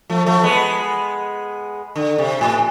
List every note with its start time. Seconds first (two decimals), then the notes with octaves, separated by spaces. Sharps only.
0.10 F3 A3
0.26 F3 A3
0.43 G#3 B3
1.96 D3
2.18 C3
2.41 A2